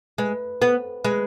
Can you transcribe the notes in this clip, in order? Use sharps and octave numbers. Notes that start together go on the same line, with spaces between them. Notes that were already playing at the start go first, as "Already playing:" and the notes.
G#3 B4
B3
G#3 B4